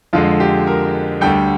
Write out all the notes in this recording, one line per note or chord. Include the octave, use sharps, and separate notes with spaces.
F2 D3 G#3 F4
G4
A#4
D2 D3 G3 G5